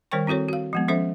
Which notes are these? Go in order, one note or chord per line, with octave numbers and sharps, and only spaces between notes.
D#3 G3 A#4 C5 G5 C#6
C4 E4 F#4 A4 C#5
F#4 F5
F3 G#3 B3
F3 C#4 A4 C5 E5